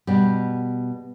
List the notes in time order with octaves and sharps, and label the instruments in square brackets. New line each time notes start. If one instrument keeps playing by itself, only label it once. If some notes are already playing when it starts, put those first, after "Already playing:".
[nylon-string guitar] B2 G3